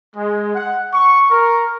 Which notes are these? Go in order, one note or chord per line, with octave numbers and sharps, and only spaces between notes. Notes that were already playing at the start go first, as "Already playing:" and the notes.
G#3
F#5
C#6
A#4